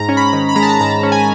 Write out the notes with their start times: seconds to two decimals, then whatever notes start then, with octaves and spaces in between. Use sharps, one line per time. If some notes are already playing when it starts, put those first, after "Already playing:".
Already playing: G#2 A#5
0.09 C#4
0.17 B5
0.33 D#3
0.49 B5
0.56 G#3 A#5
0.63 A5
0.69 A#5
0.80 G#2 A#5
1.03 C#4
1.12 G#5